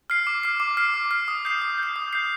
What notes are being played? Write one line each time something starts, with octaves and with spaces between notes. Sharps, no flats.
F6 C7
D6
F6 C7
D6
F6 C7
D6
F6 C7
D#6
G6 C7
D#6
G6 C7
D#6
G6 C7